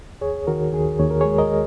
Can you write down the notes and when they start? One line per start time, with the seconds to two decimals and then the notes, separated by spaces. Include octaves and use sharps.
0.21 D#2 G#4 C#5
0.47 D#3 F#4 A#4
0.73 D#2 G#4
0.99 D#2 C#5
1.10 A#4
1.21 G#3 G#4 C#5
1.38 A#4 D#5